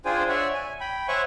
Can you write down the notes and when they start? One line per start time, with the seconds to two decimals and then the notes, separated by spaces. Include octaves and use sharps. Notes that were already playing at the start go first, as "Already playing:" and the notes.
0.05 D4 F4 G#4 C5 G5 G#5
0.29 C#5 D5 E5 F#5
0.54 G#5
0.80 G5 B5
1.08 C5 C#5 E5 F#5 G#5 C#6